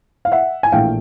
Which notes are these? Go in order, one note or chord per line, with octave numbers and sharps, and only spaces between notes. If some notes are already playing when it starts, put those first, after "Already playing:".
F5
E5 F#5
G#5
A#1 A2 E3 A3 F5 G5